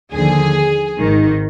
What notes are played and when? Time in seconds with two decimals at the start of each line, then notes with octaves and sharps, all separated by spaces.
0.12 D#2 D3 F3 G#4
0.98 G#1 G#2 D#3